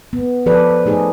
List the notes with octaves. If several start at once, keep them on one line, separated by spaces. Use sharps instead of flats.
B3
F3 A4 B4 D5
A3 D#4 G#4